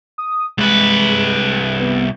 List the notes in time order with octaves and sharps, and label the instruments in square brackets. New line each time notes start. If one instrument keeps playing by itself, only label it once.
[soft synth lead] D#6
[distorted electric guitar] C2 B4 [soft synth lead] G#3
[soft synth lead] B3